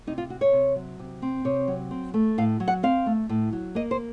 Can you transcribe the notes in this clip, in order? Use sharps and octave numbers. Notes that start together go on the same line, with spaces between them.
C3 D#4
F4
C4 F#4
C#5
C3
F#3
C3
C4
C3 C#5
F#3
C4
A3
A2 F5
F#3
F#5
C4 F5
A3
A2
F#3
A#3 D#5
C5